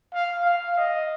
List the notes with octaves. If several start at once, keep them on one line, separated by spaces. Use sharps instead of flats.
F5
F5
D#5